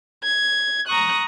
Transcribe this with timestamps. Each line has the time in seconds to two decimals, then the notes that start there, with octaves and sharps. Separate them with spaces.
0.23 G#6
0.87 A#5 C#6 D#6 F#6